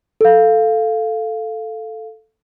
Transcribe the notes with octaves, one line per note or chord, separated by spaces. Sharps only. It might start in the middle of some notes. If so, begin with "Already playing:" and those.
A4 F5